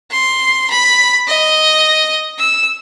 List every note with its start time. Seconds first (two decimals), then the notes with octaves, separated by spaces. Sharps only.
0.11 C6
0.70 B5
1.27 D#5
2.39 E6